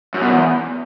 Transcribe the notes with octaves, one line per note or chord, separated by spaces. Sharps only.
F#2
B2
E2